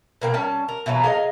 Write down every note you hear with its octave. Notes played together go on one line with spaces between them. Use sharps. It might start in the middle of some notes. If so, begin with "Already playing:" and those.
B2 A#3 G5
G3 C#4 A5
A#4
B2 E3 F#3 A#3
G#4 D#5 F5